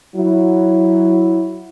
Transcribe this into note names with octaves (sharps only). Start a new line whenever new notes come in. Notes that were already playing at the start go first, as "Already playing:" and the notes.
F#3 E4